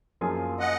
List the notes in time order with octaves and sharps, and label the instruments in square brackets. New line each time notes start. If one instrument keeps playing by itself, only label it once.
[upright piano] F#2 F3 A#3 F4 G#4
[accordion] D#5 F#5